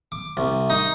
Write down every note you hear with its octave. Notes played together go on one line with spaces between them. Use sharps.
D6
C2
D#4